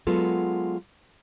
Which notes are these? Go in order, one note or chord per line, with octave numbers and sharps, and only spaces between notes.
F#3 G#3 B3 F4 A4